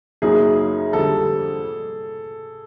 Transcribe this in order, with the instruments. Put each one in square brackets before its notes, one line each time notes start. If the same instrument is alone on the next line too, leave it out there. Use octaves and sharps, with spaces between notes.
[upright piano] F#2 C#3 F#3 A#3 D#4 [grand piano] G#4
[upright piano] F2 D3 G3 [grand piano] A4